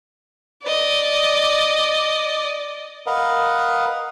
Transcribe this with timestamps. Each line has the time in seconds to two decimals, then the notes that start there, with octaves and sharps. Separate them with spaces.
0.63 D5 D#5
3.06 A#4 B4 D#5 F5 F#5